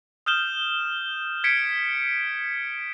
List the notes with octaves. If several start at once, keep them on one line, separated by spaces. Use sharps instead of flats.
D#6 F6 G6 E7 G7
G#6 B6 C#7 D7